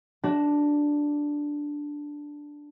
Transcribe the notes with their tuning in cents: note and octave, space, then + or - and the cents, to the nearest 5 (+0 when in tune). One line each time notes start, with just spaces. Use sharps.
D4 +0 F#4 +20